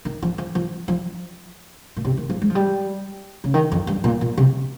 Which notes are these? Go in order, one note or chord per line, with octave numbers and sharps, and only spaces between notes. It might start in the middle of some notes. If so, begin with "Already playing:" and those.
D#3
F3
F3
F3
F3
A#2
C3
D#3
F3
G#3
F3
G3
C#3
D#3
F2
G2
A#2
A#2
C3